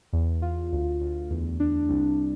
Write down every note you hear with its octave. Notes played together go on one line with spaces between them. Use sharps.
E2
F4
D2
D2
E2
D4
C2